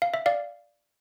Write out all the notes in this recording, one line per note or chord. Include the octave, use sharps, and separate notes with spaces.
F5
E5
D5 F5